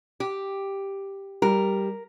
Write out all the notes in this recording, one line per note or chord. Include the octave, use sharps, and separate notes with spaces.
G4
G3 A#4